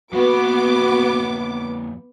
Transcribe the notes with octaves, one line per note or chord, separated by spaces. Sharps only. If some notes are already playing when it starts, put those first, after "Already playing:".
F2 A#3 B3 F#4 F#5 D6